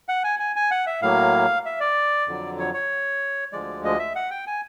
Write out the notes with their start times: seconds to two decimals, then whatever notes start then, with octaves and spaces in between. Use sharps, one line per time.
0.08 F#5
0.24 G#5
0.39 G#5
0.56 G#5
0.71 F#5
0.87 E5
1.02 A2 F#3 A#3 F5
1.66 E5
1.80 D5
2.28 F2 D3 F#3
2.59 C#5
2.74 C#5
3.53 D2 D3 F3 G#3 D5
3.84 D#5
3.99 E5
4.16 F#5
4.31 G5
4.47 G#5